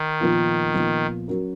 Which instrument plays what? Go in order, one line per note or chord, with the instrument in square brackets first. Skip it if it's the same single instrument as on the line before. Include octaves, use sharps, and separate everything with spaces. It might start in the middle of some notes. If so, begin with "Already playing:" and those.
Already playing: [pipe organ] D#3
[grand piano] A#2 F3 B3 F4 A#4
A#2 F3 B3 F4 A#4
F#3 C#4 F#4 A#4